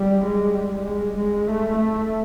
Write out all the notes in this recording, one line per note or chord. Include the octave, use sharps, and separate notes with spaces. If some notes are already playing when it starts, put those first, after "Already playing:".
Already playing: G3
G#3
G3
G#3
G#3
A3
A3